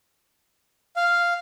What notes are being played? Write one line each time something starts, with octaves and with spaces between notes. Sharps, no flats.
F5